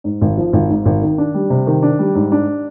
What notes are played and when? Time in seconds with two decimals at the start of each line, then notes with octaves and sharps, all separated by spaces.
0.04 G#2
0.21 G#1
0.37 F3
0.53 G#1
0.70 G#2
0.85 G#1
1.02 D#3
1.18 D4
1.34 G3
1.50 C3
1.67 D#3
1.83 D4
1.99 G3
2.15 G#2
2.32 D4